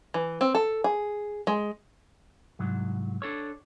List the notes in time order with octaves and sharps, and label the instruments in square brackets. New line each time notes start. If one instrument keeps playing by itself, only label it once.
[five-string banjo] E3
C4
A4
G#4
G#3
[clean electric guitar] C2 G#2 F#3
D4 A4 C#5